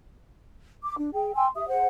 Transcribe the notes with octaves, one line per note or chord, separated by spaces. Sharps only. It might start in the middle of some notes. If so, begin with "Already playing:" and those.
D6
D4
G#4 G5
G5 G#5 C6 E6
G4 E5 D#6
G#4 C5 F#5